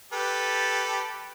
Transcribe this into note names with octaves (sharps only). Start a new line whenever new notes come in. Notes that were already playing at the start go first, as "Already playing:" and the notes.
G4 A4 B4